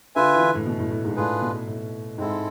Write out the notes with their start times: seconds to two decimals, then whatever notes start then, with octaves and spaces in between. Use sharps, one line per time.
0.15 D3 F4 B4 E5 G#5
0.35 E3
0.41 D3
0.55 A2
0.66 B2
0.79 A2
0.91 A2
1.04 G#2
1.16 A2 D4 F4 G#4 B4
1.41 B2
1.67 A2
2.17 G#2 G#3 C4 E4 A4